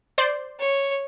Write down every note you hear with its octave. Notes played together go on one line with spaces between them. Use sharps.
C5 D5 C6
C#5